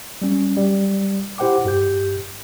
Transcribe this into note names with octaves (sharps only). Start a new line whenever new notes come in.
G3 C#4
G3
E4 G4 C5 F#5 G5 D6
G2 G4 G6